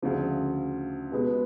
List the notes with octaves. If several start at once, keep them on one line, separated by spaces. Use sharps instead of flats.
D2 C#3 F3
B2 G#3 B3